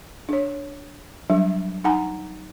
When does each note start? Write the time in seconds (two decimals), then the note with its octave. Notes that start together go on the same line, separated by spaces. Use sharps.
0.29 D4 C#5
1.30 F#3 G3 D4
1.84 D#4 F#5 G#5 A#5